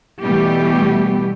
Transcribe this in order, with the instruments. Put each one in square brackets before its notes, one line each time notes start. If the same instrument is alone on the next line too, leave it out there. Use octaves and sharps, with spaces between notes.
[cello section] B2 E3 G3 A3 B3 G4